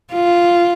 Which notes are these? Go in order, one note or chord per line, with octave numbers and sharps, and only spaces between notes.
F4